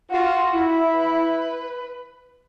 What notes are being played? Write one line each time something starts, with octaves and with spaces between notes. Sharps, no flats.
F4 F#4
E4
B4